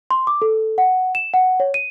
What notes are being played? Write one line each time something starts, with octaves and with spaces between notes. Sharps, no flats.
C6
D6
A4
F#5
E7
F#5
C#5
D#7